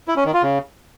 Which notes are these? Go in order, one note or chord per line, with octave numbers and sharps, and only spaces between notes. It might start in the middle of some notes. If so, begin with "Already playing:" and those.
E4
C#4
D#3
F4
C#3